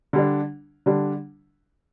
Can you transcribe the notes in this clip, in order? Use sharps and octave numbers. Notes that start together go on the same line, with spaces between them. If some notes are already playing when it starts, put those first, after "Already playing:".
D3 G3 D4
D3 G3 D4